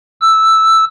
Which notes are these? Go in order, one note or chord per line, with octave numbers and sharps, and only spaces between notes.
E6